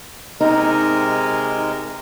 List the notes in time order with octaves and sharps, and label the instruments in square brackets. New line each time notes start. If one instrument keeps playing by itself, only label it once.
[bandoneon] C3 G#3 A#4 [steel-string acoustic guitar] D#4